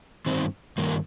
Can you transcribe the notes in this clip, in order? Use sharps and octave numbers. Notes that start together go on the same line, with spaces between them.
G2 D#3 C4
G2 D#3 A#3